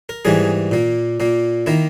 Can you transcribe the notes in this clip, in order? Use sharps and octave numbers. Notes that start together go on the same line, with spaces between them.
A#4
G#2 E3 G3 A#3 G#4
A#2 A#3
A#2 A#3
D#3 A#3 E4